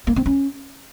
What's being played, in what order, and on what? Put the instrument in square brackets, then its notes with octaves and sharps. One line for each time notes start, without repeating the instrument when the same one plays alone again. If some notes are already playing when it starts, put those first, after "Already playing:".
[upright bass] A#3
C4
C#4